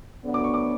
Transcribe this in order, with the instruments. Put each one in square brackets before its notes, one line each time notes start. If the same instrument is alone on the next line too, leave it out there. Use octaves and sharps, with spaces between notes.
[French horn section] D2 D3 F#3 B3
[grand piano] D6
C#6
D6